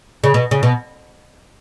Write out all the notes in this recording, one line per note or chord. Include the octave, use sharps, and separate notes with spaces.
C#3
B2
C#3
B2